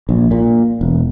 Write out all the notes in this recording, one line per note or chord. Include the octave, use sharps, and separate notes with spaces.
A#1
A#2
E1